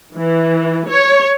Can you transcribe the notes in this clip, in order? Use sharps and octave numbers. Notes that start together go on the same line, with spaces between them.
E3
C#5